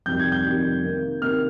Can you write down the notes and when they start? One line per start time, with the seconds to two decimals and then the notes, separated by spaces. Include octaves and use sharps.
0.06 F2 C3 D#3 G3 G6
0.20 G#6
0.32 G6
0.45 F2 C3 D#3 G3
0.84 C3 D#3 A#3
1.22 C3 D#3 A#3 F6